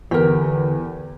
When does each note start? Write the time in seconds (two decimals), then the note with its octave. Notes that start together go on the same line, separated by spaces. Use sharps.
0.11 E2 D3 G4 A#4